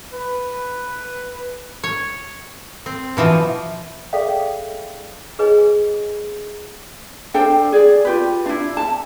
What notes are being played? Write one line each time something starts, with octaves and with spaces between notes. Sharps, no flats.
B4
C#5
C4
B2 E3 F3
G#4 A4 D5 E5 F5 G5
G#4 B4 C#5 D#5 G#5
D4 A4 C5 G5
G#4 D5
F4 G4 B4
D4 E4
A5